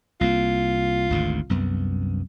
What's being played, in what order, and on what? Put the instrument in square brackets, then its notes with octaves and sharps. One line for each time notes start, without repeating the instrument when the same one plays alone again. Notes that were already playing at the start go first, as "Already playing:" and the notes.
[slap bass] C2 A#3 [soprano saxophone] F4
[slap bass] G#1 D2 G#2
C2 F#2 B3